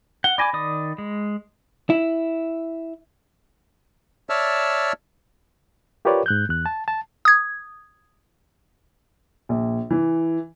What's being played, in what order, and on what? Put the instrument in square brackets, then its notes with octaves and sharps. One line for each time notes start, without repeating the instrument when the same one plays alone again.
[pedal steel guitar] F#5 [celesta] G7
[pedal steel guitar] D5 G#5 D6 [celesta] B5 A#6
[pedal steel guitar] D#3 D5 D#6
G#3
[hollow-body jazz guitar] E4
[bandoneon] C#5 D5 E5 A5 E6 F6
[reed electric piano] F4 G4 A#4 B4 C#5 D5
G#2 F#6 G6
E2 F#6
A5
A5
[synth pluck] D#6 G#6
[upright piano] A#1
E3